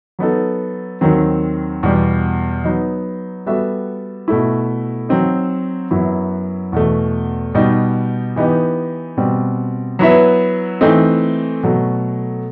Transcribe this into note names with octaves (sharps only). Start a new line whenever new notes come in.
F#3 B3 D#4 A4
D#2 D#3 F#3 C4
E2 B2 G3
F#3 B3 D#4
G3 B3 F#4 A4 E5
B2 A3 E4
F#3 C4 D#4
F#2 F#3 B3 E4
E2 B2 A3
B2 G3 D#4
E3 B3 D#4 G4 D#5
B2 G3 C4
F#3 B3 E4 B4 E5
E3 A3 C4 D#4
B2 F#3 A3